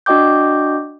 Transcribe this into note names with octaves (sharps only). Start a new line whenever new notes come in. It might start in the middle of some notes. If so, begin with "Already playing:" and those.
D4 F#4 D#5 G5 D6 G6